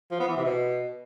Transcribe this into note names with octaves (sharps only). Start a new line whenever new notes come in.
F3
B3
E3
C3
B2